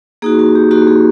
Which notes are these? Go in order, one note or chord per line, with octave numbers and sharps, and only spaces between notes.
A#3 D#4 F#4 G#4
F#4
G4
A#3 D#4 F#4 G#4
G#4